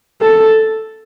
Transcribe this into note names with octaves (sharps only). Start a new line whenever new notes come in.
A4